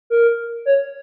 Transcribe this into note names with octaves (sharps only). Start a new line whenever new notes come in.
A#4
C#5